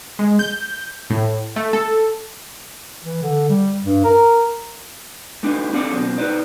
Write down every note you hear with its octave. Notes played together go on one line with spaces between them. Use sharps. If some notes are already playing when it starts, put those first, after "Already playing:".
G#3
G6
A2
A3
A4
E3
D3
G3
G2
A#4
A3 D4 D#4 B4
C4 D4 F4 G#4 A4 D5
F#2 B2 C4
D#4 B4 C5 D5